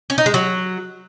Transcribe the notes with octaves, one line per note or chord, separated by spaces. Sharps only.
C#4
D#4
G#3
F#3